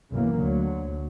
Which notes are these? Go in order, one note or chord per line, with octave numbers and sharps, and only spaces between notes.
B1 F#2 C#3 E3 A#3
D2 D3 F#3